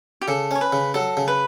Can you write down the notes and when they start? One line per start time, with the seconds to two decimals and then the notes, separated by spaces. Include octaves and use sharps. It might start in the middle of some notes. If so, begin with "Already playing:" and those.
0.21 G4
0.28 C#3 A4
0.51 C#4 C#5
0.61 B4
0.72 C#3
0.94 F#3 A4
1.17 C#3
1.28 B4